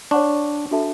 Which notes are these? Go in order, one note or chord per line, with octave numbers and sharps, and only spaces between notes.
D4 C#5 F#5 C#6
D4 F#4 A4 E5 A5